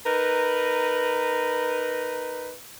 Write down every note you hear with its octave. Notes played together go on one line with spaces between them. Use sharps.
D#4 A#4 B4